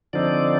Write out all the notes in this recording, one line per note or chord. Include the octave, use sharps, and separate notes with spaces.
D3 F3 C4 D#4 D5